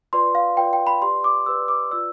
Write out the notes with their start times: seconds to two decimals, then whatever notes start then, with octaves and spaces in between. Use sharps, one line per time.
0.13 F4 B4 D5 C6
0.35 F5
0.57 F4 B4 D5 G5
0.73 G5
0.87 B5
1.02 G4 B4 D5 C6
1.24 D6
1.46 G4 B4 D5 E6
1.68 D6
1.91 F4 B4 D5 E6